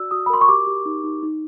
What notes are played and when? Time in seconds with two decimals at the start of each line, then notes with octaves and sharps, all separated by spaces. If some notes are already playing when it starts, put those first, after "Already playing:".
Already playing: F#4 D5 E6
0.11 F#4 D#6
0.26 B5
0.30 A#4 C6
0.41 C#6
0.48 G4 D6
0.67 G4
0.86 D#4
1.04 D#4
1.23 D#4